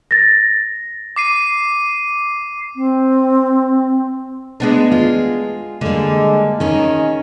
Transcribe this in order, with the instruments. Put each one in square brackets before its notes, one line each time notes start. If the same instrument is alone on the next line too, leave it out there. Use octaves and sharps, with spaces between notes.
[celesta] A6 A#6
[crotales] D6 C7 D#7
[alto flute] C4
[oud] G#3 B3 D4
[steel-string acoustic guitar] F4 G#4
[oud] D3 [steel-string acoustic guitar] G3 A#3 [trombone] G#3
[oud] D#3 [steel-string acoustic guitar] C#4 G#4 [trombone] D#4